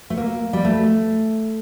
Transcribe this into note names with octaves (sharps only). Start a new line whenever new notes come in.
A3
A#3
G3
A3